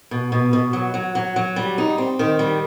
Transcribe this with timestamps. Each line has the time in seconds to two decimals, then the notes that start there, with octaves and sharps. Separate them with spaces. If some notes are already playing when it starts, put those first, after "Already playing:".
0.11 B2
0.32 B2
0.53 B2
0.73 F#3
0.94 F#3
1.15 F#3
1.36 F#3
1.56 G3
1.78 D#4
1.98 C4
2.19 D#3
2.39 G3